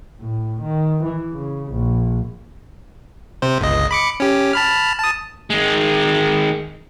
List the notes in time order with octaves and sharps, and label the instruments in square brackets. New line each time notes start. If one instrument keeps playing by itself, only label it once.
[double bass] A2
D#3
E3
C#3
A#1
[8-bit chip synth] C3 C5
G1 C#2 D#5
B5 D6 C#7
C#4 G4
A5 B5 F6
A5 D#6
[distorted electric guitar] D#3 G#3